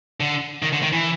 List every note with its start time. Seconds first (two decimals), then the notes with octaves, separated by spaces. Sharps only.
0.20 D3
0.63 D#3
0.73 D3
0.82 D#3
0.93 E3